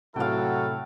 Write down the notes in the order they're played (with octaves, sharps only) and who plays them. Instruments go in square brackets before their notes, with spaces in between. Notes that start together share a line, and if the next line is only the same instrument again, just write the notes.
[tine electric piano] A2 C3 [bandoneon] F#3 [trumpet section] E4 F#4 A4 [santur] F5 G5